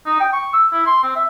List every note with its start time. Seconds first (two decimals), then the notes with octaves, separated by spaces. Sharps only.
0.06 D#4
0.20 G5
0.33 C#6
0.53 E6
0.73 E4
0.86 C6
1.03 C4
1.16 E5